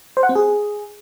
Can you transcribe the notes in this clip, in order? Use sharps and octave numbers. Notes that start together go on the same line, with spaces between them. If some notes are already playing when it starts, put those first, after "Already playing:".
C5
F#5
C4
G#4